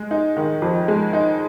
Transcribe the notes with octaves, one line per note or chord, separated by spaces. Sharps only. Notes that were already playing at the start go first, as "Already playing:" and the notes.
Already playing: G#3
D#4
D#3
F2
G#3
D#4